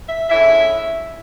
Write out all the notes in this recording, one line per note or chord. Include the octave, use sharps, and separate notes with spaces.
E5
D3 G#3 C#4 E4 E5